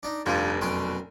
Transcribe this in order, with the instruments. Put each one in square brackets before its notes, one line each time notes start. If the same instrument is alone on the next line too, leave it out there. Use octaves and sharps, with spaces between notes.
[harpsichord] D4 D#4
[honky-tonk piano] F1 D#7 [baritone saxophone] G2 [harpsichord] F4
[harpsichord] F#2 G5 C6 [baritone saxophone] B2